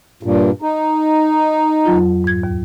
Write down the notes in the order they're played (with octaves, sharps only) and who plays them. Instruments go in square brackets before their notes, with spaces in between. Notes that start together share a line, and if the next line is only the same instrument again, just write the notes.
[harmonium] G2 A#2
D#4
[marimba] F2 F#3 F4
G#2 G#6
D#2